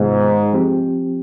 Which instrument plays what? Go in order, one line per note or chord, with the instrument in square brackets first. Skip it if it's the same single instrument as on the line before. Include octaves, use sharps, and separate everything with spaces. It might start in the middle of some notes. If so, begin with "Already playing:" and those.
Already playing: [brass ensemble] G#2 [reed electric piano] C3 D#3 G#3 B3 F4
[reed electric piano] F3 C4 G4